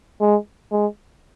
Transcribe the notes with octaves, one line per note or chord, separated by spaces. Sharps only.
G#3
G#3